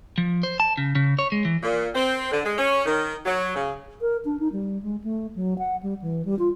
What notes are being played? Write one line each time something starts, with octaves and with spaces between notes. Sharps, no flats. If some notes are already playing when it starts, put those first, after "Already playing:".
F3
C5
A5
C#3
C#3
C#5
G#3
E3
A#2
C4
D3
G#3
C#4
D#3
F#3
C#3
A#4
D4
D#4
G3
G#3
A3
F#3
F#5
G3
E3
G3
F4